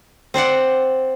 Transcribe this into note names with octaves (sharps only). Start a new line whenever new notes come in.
C4 C5 D5 F#5